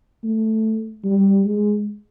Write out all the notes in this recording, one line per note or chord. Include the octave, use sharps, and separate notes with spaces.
A3
G3
G#3